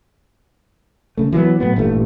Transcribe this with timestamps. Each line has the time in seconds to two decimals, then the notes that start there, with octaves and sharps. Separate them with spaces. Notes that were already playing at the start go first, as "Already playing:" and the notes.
1.17 C#3 A3
1.33 E3 F#3 A3 B3
1.60 A2 F#3 B3
1.76 A1 G2 A#2 A3